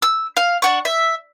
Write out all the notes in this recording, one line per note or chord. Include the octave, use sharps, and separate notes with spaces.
E6
F5
D4 F#5 C#6
E5